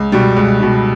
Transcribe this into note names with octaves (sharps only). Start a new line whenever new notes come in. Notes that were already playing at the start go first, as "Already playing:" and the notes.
Already playing: C#2
B2 G3
C#2
B2 G3